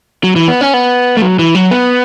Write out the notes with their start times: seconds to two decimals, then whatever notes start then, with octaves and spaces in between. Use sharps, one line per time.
0.24 F#3
0.36 E3
0.48 B3
0.61 C#4
0.74 B3
1.17 A3
1.22 F#3
1.39 E3
1.55 F#3
1.71 B3